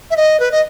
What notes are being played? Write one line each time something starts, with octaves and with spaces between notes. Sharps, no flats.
E5
D#5
B4
D#5